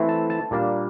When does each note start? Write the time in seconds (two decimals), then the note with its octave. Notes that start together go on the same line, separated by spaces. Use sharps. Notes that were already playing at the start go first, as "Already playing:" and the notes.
Already playing: E3 A3 C4 E4
0.09 A5
0.30 A5
0.51 A#2 G3 A#3 D4